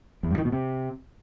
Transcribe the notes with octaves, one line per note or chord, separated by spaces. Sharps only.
E2
G2
D#3
B2
C3